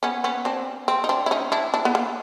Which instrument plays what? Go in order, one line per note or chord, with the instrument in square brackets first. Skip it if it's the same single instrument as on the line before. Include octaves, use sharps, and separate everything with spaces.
[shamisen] B3 C#4
B3 C#4
C4 D4
C4
D#4
C4 D4
E4
C#4 D#4
D4 E4
D4 E4
B3
A#3